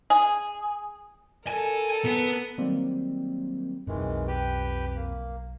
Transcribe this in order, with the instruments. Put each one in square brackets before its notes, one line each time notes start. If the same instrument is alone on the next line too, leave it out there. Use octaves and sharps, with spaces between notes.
[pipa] G#4
[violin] A4 A#4 [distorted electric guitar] G#5
[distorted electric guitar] B3
[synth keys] D#3 F#3 G3 A#3 C4
[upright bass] B1 [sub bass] F2 [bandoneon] D#3 E3 G#3
[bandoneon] G4 B4 G5
A#3